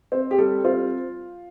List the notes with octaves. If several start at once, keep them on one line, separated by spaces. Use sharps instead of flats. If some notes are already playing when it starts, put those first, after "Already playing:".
C4 C5
G4
G3 A4
C4 F4